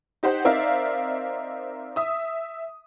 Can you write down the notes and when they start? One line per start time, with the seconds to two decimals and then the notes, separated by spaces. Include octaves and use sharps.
0.23 D#4 G4 C5 F#5
0.45 C4 D#4 A#4 D5 E5 F5
1.96 E5 D#6